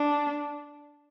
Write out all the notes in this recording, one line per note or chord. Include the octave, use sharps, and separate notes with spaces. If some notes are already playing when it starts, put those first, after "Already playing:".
Already playing: D4